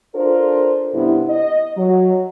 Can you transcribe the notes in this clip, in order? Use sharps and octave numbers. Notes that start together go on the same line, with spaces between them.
D4 F4 A4 A#4 C5
G2 C3 B3 E4
D#5
F#3